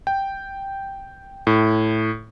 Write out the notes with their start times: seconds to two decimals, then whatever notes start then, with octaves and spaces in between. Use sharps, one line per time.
0.07 G5
1.47 A2